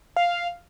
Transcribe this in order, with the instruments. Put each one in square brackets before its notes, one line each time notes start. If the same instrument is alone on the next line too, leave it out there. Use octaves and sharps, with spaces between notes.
[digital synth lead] F5